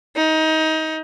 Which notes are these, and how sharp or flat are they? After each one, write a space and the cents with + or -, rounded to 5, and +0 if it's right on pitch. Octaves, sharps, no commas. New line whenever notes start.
D#4 +25